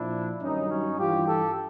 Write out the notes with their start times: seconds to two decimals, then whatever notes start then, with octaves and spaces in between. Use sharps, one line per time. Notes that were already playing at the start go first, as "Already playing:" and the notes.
Already playing: A#2 F3 D4 E4
0.41 G2 D#3 F#3 C#4 D#4
0.70 C#4 D#4
0.98 G2 E3 F4 G4
1.26 G4 A4